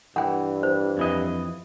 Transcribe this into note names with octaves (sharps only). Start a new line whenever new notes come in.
G2 E3 F#5 G5
C5
F2 E3 D#5